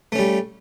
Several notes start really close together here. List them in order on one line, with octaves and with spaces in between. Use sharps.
A3 C#4 G3